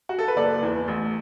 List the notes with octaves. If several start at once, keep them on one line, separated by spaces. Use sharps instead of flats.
F#4
A4
B4
F#1 A4 D5
E2 E3
A1